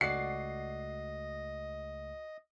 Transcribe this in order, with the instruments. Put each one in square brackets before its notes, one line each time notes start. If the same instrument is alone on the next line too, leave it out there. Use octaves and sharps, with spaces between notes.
[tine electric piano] C#2 A3 [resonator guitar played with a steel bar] F#4 D5 [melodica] D#5 [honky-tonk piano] C7